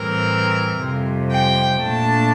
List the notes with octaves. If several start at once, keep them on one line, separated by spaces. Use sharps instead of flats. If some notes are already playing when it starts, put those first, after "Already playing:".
Already playing: A2 E3 G3 C4 A#4
F2 C3 G3
G5
A#2 A3 D4 A5